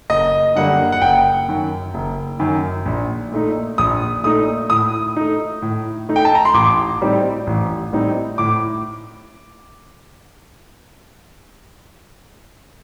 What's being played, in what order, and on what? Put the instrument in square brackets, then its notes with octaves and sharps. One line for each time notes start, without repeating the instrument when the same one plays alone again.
[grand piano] F#1 D#5
F#2 D3 G3 A#3 F#5
F#5
F#1 G5
F#2 D#3
F#1
F#2 D#3
A#1
A#2 A3 D#4
A#1 D#6
A#2 A3 D#4 D#6
A2 D#6
A3 D#4
A2
A3 D#4
G5
A5
A#5
C6
A1 D6
A2 G3 C4 D#4
A1
A2 G3 C4 D#4
A2 D6